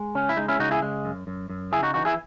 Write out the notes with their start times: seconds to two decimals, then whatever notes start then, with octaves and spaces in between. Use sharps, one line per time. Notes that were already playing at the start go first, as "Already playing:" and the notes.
Already playing: G#3
0.15 C#3 C#4
0.29 E4
0.37 G#3 D#4
0.48 C#4 E4
0.59 C#3 D#4 F#4
0.71 E4 G#4
0.82 G#3
1.05 F#2
1.27 F#2
1.50 F#2
1.72 C#3 E4 G#4
1.83 D#4 F#4
1.94 E3 D#4 F#4
2.05 E4 G#4